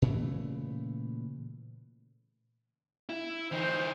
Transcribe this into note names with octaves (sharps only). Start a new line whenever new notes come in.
A#2 C#3 E3 A3
E4
E3 D#4 C5